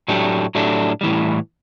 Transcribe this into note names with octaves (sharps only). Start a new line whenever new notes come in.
A2 F#3 A3 D4 G4
A2 F#3 A3 D4 G4
A2 E3 G3